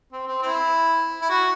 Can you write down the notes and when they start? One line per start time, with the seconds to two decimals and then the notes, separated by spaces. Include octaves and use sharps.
0.13 C4
0.27 C4
0.42 C4 E4
1.22 E4
1.30 F#4